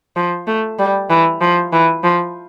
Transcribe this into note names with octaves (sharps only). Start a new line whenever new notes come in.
F3
A3
G3
E3
F3
E3
F3